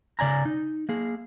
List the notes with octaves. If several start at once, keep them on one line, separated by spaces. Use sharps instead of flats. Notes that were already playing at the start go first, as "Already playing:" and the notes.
C#3 D5 G#5 A#5
D#4
A#3 G#4